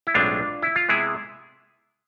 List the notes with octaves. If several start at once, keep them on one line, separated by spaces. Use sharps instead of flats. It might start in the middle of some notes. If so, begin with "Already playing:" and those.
E4
B1 A2 G#3 C4 D4 F4
E4
F4
C3 G#3 B3 E4 G#4